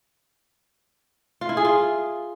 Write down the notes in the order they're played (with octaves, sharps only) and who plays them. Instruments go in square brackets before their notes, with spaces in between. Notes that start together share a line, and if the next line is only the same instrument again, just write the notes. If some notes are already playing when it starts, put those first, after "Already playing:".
[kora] F4
E4
G#4
F4